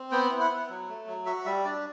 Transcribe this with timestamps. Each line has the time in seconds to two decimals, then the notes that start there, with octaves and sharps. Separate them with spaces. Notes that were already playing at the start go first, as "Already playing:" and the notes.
Already playing: C4
0.11 B3 G5
0.30 E4
0.41 F#5
0.50 B3
0.69 F#3
0.89 A3
1.07 F#3
1.26 F#4 E5
1.46 G3 E5
1.65 D4 D5